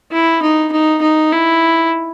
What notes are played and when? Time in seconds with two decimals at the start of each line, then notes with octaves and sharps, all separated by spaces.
0.12 E4
0.42 D#4
0.72 D#4
1.02 D#4
1.32 E4